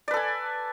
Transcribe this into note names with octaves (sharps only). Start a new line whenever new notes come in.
A4 B4 D5 G#5